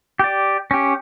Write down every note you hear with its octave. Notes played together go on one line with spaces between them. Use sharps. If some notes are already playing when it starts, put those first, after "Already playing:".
G4 D5
C#4 G4